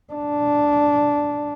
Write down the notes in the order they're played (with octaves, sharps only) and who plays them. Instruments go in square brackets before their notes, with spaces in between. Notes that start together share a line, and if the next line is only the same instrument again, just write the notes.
[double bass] D4